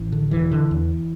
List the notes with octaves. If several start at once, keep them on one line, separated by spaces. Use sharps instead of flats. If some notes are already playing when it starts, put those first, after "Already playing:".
Already playing: A1 E3
D3
E1 E3
D3
E2